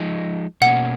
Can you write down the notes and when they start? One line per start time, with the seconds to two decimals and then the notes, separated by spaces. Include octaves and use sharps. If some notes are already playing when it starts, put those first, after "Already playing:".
Already playing: F3 G#3 D#4
0.61 B2 A#3 C#4 F#5